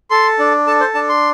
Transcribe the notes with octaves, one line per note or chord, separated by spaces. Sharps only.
A4 C6
D4
A4 A5
C5
D4 A5
C6